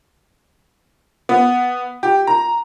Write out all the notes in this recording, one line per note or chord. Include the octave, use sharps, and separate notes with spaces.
B3
G4
A#5